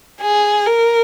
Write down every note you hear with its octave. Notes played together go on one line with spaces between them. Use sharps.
G#4
A#4